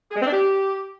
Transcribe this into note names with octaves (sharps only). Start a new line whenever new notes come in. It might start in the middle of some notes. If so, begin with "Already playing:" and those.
G#4
G#3
C4
D4
G4